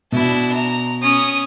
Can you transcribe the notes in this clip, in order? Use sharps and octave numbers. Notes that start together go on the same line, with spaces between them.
B2 D4 E4
A#5
C#4 D#6